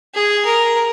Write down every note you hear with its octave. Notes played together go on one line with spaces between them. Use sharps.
G#4
A#4